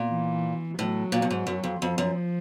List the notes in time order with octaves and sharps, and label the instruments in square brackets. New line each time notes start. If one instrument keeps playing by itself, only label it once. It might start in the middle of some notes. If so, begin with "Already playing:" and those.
Already playing: [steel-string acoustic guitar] A#2
[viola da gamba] E3
[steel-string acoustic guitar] A2 [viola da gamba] F#3
[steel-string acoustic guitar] A#2
G2
G#2
F#2
F2
[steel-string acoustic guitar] F2 [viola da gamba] F3
[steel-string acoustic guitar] F#2